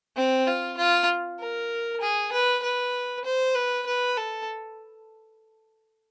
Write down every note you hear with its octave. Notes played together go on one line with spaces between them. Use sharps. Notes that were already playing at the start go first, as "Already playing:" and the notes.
C4
F4
F4
A#4
G#4
B4
B4
C5
B4
B4
A4